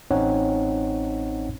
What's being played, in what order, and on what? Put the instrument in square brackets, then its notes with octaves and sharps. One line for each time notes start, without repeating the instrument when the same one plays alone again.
[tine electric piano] A1 C4 C#4 D#4 C#5 F#5